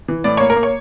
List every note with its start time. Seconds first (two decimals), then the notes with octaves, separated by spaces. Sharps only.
0.08 E3
0.24 A2 D5
0.37 A#3 C#5
0.50 A#4
0.56 A#3
0.63 C#5